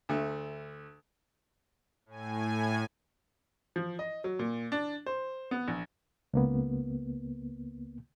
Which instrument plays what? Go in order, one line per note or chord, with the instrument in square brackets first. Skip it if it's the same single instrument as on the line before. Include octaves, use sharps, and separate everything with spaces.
[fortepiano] D2 A3
[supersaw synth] A2 G#5
[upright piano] F3
D#5
F#3
A#2
D4
C5
B3
A#1
[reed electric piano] C#2 A#3 B3